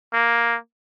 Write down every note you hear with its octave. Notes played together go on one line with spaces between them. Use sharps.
A#3